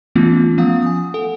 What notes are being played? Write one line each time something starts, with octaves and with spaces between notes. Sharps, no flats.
E3 A3 B3 C#4 F4
F3 B3 F5 F#5 D#6
G#5 D#6
A4 F#5